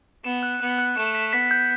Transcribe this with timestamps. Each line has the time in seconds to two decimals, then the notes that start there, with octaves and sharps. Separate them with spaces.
0.24 B3 E7
0.43 F#6
0.60 B3 F#6
0.78 F#6
0.97 A3 E7
1.15 B6
1.33 B3 B6
1.51 G6